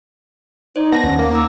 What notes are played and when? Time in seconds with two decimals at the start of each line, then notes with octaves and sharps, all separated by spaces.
0.76 D#4 C5 D5
0.92 B3 F#5 A5 A#6
1.04 D#2 C#4
1.19 A#3
1.31 D#4 A#5 D6 E6